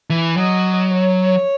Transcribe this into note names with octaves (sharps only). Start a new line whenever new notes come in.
E3
F#3 D#5
C#5